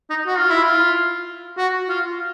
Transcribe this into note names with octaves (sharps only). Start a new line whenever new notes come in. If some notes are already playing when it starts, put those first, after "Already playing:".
D#4
F#4
F4
E4
F4
F#4
F4